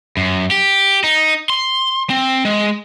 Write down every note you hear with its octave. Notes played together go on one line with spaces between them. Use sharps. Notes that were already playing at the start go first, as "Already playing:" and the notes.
F#2
G4
D#4
C6
C4
G#3